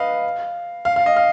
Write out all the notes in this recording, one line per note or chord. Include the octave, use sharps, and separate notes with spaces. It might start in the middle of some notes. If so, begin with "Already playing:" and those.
Already playing: B4 D#5 F5
F5
F5
D#5
F5